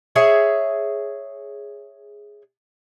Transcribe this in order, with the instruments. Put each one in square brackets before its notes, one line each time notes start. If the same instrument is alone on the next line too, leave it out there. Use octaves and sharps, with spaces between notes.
[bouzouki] G#4 C#5 E5